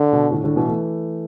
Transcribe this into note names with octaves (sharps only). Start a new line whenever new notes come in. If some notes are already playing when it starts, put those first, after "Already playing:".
Already playing: D3
B2
A2 D3
A2 D3
B2 E3
E3 A3